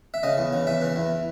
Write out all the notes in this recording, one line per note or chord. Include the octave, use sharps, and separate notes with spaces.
E5
C#3 D#5
E2
C#3
E2 E5
E3
E2